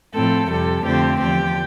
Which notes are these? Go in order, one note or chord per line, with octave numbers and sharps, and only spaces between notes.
A2 F3 C4 A4
F2 C3 G3 A4
F2 D3 F3 A3 C4 G4
E2 D3 F3 G4